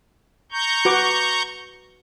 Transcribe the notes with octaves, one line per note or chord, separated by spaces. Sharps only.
A#5 C#6 G6
F#4 B4 D6